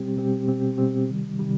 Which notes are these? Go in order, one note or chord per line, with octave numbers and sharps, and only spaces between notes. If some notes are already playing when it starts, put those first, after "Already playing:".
Already playing: B2 G3 C4 G4
B2 G3 C4 G4
B2 G3 C4 G4
B2 G3 C4 G4
C3 D#3 G3
C3 D#3 G3